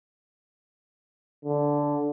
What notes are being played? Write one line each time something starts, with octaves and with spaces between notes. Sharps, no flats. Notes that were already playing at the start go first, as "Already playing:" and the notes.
D3